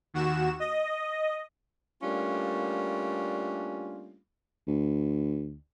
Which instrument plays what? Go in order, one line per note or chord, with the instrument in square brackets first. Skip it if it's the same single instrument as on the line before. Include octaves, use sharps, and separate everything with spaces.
[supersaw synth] D#2 F#4 E7
D#5
[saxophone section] G3 A3 A#3 C#4 D4 F4
[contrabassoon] D2